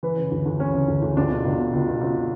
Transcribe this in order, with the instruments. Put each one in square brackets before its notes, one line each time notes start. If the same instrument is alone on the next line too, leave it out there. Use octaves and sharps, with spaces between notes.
[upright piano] E3 B4
C#3
D2
D2
E3 C#4
C#3
D2
D2
C#2 D4
B2
C#2
B2
C#2
B2
C#2
B2